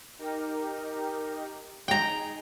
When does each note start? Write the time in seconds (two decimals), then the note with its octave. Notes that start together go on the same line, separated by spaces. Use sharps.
0.19 D#4 G4 A#4
1.88 D#4 G#4 G5 A#5